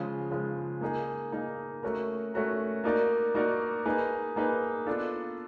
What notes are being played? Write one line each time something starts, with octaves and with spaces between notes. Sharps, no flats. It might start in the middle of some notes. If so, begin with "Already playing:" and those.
Already playing: C#3 F3 G#3
C#3 F3 G#3
A#3 D#4 G#4
A#3 D#4 G#4
A3 C#4 F#4 A#4
A3 C#4 F#4 A#4
A#3 D#4 F#4 A#4 D5
A#3 D#4 F#4 A#4 D5
A#3 D#4 G#4 B4
A#3 D#4 G#4 B4
B3 D4 F4 A4